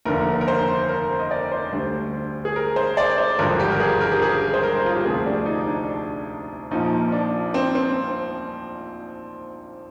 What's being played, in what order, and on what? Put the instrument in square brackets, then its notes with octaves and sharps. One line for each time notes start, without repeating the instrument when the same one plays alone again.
[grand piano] F1 D#2 D3 A#4
A#4
C5
A#4
D#5
D5
C5
D2 D3 G3
G#4
A#4
C5
D5
C5
G#1 G2 D3 F3 A#4
G4
A#4
G#4
A#4
G4
G#4
C5
A#4
F4
G4
D2 C3 F3 G#4
D4
D#4
D4
A#1 A#2 F3 D#4
D4
C4
C4